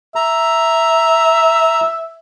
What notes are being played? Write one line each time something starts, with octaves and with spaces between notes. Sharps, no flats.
E5 A#5